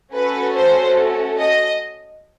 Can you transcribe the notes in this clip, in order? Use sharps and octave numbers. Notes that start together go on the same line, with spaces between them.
A3 C#4 F#4 A4 B4
C5
D#5